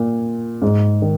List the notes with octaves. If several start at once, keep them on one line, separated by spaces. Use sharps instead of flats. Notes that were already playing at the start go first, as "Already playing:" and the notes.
Already playing: A#2
G#2
D#3